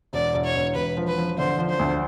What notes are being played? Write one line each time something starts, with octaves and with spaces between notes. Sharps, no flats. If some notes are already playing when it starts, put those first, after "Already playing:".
E1 D5
E1
C#5
E1
E1 B4
F3
B4
F3
D3 C5
F3
C5
D2